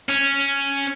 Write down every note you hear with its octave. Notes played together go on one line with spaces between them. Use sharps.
C#4